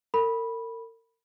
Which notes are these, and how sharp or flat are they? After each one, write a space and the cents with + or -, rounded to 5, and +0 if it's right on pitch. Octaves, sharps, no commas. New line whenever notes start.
A#4 -40 B5 -15